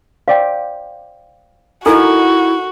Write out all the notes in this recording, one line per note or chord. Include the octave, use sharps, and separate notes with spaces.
C5 D5 F5 G5
D#4 E4 F#4 A4 A#4 G#5